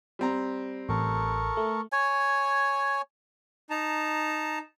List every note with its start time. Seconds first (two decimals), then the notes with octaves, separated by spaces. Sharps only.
0.19 G3 C4 A#5
0.89 A1 A4 A#4 C#6
1.57 A3
1.92 C#5 G#5
3.70 D#4 A5 A#5